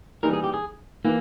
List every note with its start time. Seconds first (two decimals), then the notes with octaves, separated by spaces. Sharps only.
0.23 E3 G3 A#3 D#4 A#4
0.33 G#4
0.44 G4
0.54 G#4
1.05 E3 A#3